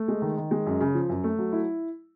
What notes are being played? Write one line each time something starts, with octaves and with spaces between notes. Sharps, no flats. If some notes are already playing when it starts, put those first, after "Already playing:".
Already playing: A3
G#3
D#3
D#3
G#3
F#2
C#3
F3
F#2
A3
F#3
E4